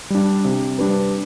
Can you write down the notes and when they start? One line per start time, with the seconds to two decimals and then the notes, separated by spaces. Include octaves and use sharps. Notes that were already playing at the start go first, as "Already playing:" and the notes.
0.10 G3 D4
0.45 C3
0.78 G3 D4 G4 B4